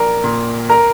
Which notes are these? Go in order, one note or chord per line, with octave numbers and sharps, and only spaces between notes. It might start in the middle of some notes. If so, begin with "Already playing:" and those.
Already playing: A#1 A#4 A#5
A#2
A#4 A#5